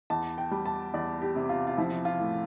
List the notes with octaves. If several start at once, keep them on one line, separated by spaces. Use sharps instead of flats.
E2 A5
G5
G3
A5
E2 D5
G4
C3
F4
F4
F3 E4
F4
A2